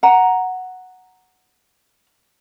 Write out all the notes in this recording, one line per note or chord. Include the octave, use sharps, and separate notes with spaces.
F#5 A#5